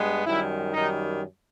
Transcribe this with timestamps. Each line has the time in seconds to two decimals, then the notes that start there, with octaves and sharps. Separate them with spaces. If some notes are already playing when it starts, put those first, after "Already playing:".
Already playing: G2 G#3 B3
0.25 F#2 D#3 G3 E4
0.74 F#2 D#3 G3 D#4